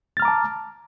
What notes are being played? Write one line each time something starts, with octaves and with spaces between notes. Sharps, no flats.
A5 A#5 D6 F6 A6